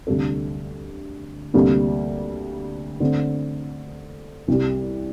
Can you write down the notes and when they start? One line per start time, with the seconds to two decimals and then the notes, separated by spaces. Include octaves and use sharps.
0.07 D2 C3 G3 D4 A4
1.54 D2 C3 G3 A#3
3.00 D3 A3 C4
4.48 C2 C3 G3